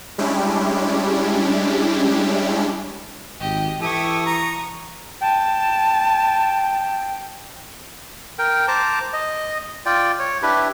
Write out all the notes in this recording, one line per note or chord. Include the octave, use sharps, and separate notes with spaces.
G3 G#3 C#4 D4 E4 G4
G#1 G4 D#5
E3 E4 G4 A4 C#6 D#6
A#5
G5 A5
A#4 G5
C5 A5 A#5 D6
D#5
F4 D5 G5
C#5
D4 E4 G4 B4